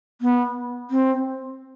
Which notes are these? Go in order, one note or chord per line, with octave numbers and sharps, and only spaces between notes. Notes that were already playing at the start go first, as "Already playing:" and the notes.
B3
C4